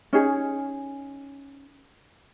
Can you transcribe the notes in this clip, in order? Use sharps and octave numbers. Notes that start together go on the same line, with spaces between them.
C#4 D#4 G#4